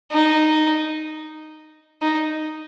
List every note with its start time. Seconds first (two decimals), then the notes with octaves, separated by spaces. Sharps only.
0.12 D#4
2.02 D#4